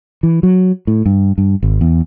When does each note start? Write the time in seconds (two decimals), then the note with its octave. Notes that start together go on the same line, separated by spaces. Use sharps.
0.23 E3
0.43 F#3
0.87 A2
1.06 G2
1.38 G2
1.63 G#1
1.81 E2